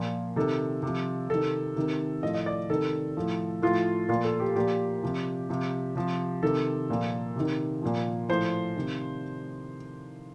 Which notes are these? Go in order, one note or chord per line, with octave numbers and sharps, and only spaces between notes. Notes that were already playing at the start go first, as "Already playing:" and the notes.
Already playing: A#2 F3
C3 D#3 A4
C3 F3
C3 D#3 A4
C3 D#3
A2 F3 D#5
D#5
D5
C3 D#3 A4
A2 F3
A2 F3 F4
A#2 F3 F4
A4
G4
A#2 F3 G4
C3 F3
C3 F3
C3 F3
C3 D#3 A4
A#2 F3
C3 D#3
A#2 F3
A2 F3 C5
C3 D#3